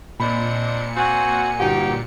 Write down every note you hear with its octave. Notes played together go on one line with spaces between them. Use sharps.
A#2 C4 D4 D#5 B5 C#7
C4 F#4 G#5
G1 D#4 F#4 G4